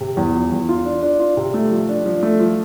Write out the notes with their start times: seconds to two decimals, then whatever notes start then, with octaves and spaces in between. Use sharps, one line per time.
0.01 C3
0.17 E2
0.34 F3
0.52 E2
0.69 F4
0.85 D4
1.03 D4
1.19 F4
1.37 C3
1.54 A3
1.71 F3
1.89 D4
2.06 F3
2.23 A3
2.40 F3